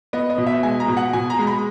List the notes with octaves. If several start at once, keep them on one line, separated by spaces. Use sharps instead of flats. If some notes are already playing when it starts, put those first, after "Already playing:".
B3 D#5
D#5
B2
E5
G#3 G#5
A#5
B2
F#5
B2 G#5
A#5
G#3
B5